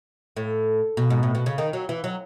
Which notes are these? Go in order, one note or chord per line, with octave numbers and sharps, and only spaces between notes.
A2
B2
G#2
A2
B2
C#3
D#3
F#3
E3
F#3